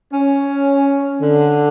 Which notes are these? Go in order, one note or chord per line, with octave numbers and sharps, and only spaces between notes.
C#4
D3